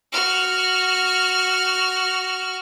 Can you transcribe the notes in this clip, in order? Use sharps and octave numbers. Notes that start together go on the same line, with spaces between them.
F#4 F6